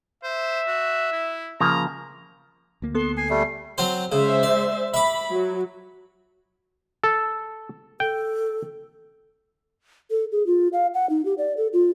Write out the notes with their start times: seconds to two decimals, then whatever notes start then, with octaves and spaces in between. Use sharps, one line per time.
0.24 C5 E5
0.67 F#4
1.12 E4
1.60 C#3 F3 A#3 A#5
2.82 D2 A#3
2.95 B3 A4 C6
3.17 G#5 C7
3.30 G3 A3
3.78 F#3 C4 C5
4.12 C#3 G#3 C5 E5
4.43 D5
4.94 E5 B5 D6
5.32 F#3
7.04 A4
8.00 A4 G5
10.11 A4
10.32 G#4
10.47 F4
10.73 F5
10.94 F#5
11.10 D#4
11.25 G4
11.38 D5
11.57 A4
11.73 F4